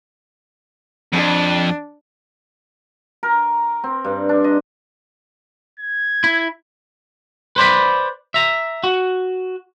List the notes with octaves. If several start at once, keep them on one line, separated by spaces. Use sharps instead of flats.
F2 D4
A#4
C4
G2
D4
D#5
G#6
E4
B4 C5 D5 B5
E5 A#5
F#4